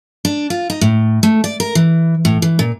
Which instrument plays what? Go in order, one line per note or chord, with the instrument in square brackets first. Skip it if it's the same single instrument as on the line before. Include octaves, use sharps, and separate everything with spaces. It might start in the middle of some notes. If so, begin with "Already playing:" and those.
[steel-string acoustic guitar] D4
F4
D#4
A2
A3
D5
A#4
E3
A2
E3
A#2